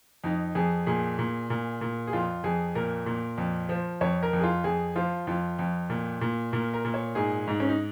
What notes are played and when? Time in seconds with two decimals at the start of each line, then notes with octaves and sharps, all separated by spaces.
0.24 F2 D#4
0.55 F2 G#4
0.87 A#2 G#4
1.18 A#2
1.50 A#2
1.81 A#2
2.07 G#4
2.13 F2 F4
2.44 F2 G#4
2.75 A#2 A#4
3.06 A#2
3.38 F2
3.69 F3
4.01 F2 C#5
4.23 A#4
4.33 F2
4.39 G#4
4.43 F4
4.64 F2 G#4
4.96 F3 F4
5.27 F2 F4
5.59 F2
5.90 A#2
6.21 A#2
6.53 A#2 A#4
6.74 A#4
6.85 A#2
6.94 C#5
7.15 G#2 G#4
7.47 G#2
7.60 C#4
7.69 D#4